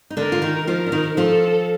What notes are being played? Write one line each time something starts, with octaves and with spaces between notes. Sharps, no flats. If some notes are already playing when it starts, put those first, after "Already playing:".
D#4
D3 D4 A#4
F4
D#3 D#4
F3 F4 A#4
D4
D#3 D#4
F3 F4 A4